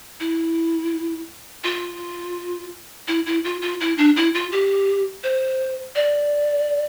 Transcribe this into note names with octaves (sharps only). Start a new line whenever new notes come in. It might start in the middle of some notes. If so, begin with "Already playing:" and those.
E4
F4
E4
E4
F4
F4
E4
D4
E4
F4
G4
C5
D5